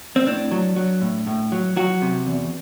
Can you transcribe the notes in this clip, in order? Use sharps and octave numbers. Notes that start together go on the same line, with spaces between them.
C4
A2 D4
F#3
F#3
A2
A2
F#3
F#3 F#4
C3
E2